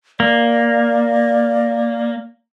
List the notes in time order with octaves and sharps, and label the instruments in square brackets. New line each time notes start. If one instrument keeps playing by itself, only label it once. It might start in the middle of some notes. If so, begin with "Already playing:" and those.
[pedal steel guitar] A#3 [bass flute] D5